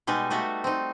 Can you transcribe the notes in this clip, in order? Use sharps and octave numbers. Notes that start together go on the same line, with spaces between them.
B2 G3 G#3 D#4
G3 A3 B3 F#4
C4 D#4